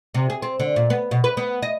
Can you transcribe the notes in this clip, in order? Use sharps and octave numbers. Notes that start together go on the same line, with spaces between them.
C3
G#4
C4
D3
A#2
B3
B2
B4
B3
D#5